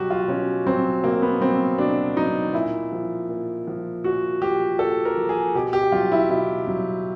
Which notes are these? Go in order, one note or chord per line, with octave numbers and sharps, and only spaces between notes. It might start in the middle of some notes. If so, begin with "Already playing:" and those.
Already playing: B2 F#3 F#4 G4
F4
B2 C#4
F#3 C4
B2 A#3
B3
F#3 C4
B2 D4
F#3 D#4
A#2 E4
F3
A#2
F3
A#2 F#4
F3 G4
A#2 A4
A#4
F3
G#4
B2 G4
G4
F#3 F4
E4
B2 E4
F#3